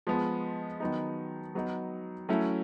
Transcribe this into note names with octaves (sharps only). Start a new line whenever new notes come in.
F3 G#3 B3
D#3 F#3 B3 D#4
F#3 B3 D#4
F#3 A3 C#4 E4